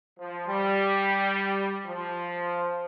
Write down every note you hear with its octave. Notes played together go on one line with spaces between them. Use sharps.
F3
G3
F3